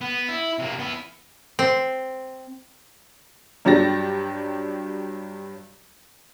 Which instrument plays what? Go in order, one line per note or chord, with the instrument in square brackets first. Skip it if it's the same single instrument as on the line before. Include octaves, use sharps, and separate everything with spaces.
[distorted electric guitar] B3
E4
C3 A#3
B3 E4
[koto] C4
[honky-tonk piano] G2 F#3 D4 G4 A6 A#6